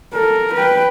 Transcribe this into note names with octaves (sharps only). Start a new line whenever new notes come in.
A4 A#4
B4 G5